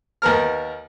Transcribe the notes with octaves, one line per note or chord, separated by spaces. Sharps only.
D#2 B3 A#4 F6